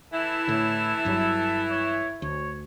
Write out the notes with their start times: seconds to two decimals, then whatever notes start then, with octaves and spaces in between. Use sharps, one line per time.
0.12 E3 E4 A4
0.47 A2 D3
1.05 G1 G2 F#3
1.70 C#5
2.22 D2 C#5